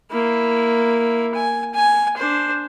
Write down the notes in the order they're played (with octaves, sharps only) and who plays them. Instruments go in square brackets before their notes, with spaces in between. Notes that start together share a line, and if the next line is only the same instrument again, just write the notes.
[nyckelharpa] A#3 E4
G#5
G#5
D4 C5